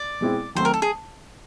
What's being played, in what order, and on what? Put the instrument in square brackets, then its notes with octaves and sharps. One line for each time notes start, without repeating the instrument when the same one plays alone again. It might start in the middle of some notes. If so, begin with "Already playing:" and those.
Already playing: [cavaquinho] D5
[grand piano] B2 G#3 C4 E4
[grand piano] D#3 F#3 A3 C4 [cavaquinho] C5
[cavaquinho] A#4
A4
G#4